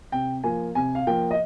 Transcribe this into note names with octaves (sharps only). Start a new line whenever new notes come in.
C3 G5
F3 A#3 G#5
C3 G#5
F5
F3 A#3 G5
D#5